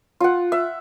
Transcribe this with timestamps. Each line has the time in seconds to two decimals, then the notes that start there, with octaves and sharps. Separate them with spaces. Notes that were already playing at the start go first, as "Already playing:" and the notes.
0.20 F4 F#5
0.52 E5